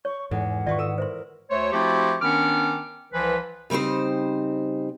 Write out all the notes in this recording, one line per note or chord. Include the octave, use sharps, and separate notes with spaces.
C#5 C#6
E2 G#2 G#3 A4 F#5
G#2 D#3 F4 B4 D5 E5 C#6
A4 D#6 E6
A#4 C5 E5 C6
D2 A3 C5 C#5
F3 A3 C4 E4 F#4 G4
D#3 B3 C#4 D4 D6 F6
C2 E3 F3 B4
C#3 G3 C4 D#4 C5